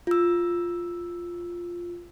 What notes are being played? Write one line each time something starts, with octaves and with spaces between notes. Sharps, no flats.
F4 E6